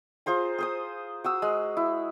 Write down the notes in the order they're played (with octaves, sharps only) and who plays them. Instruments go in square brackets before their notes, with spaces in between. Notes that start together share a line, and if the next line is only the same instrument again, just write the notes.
[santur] F4 G#4 C5 A#5
G#4 C5 D#6
F#4 D#6 E6
G#3
E4